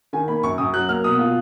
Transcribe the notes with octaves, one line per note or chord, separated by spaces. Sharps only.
D#3 G#5
A#3 B5
F#2 C#6
F#2 D#6
F#3 F#6
A#3 F6
B2 D#6
F4